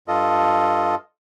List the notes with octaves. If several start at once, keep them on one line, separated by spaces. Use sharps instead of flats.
G2 F4 A4 D#5